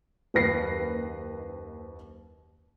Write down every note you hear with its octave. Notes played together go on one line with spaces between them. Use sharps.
F#1 D#2 B4 A#6 C7